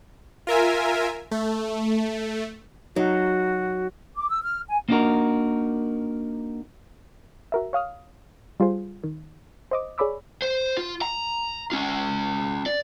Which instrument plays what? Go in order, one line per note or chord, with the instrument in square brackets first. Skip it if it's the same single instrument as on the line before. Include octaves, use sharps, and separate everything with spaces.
[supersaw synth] F4 A#4 E5 G#5
A3
[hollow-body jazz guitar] F#3 D#4 [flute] F#4
[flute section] D6
E6
F6
G#5
[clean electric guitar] A#3 B3 D4 D#4 F#4 A#4
[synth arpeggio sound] F#4 A#4 E5
C#5 F5 D#6 F6
G3 F4 G#4 C5
D#3
C5 D#5 D6
G#4 C#5 D5 B5 D6 E6
[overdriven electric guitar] C5
F4
A#5
C#4 F4
D5